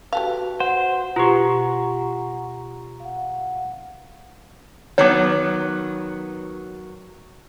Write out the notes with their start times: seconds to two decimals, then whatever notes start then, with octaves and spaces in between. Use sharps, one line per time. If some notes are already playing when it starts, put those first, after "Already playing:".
0.13 F#4 G4 A4 B4 F5
0.60 C5 F#5
1.16 B2 F4 G4 F#5 A#5 C6 C#6
3.00 F5 F#5
4.98 D#3 F#3 B3 C#5 D6